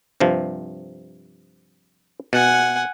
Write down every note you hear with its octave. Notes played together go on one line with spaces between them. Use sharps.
G2 C3 F3
B2 F#5 G#5